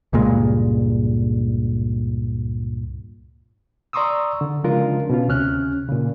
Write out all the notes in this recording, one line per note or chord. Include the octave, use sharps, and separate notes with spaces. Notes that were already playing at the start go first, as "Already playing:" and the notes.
C#2 G2 A#2 G#3
D5 A#5 C6 C#6 D#6 E6
D3
C#3 F3 G#3 D4 F4 A#4
B2 C#4 F4
D2 C3 C#4 F6 F#6
A#2 C#3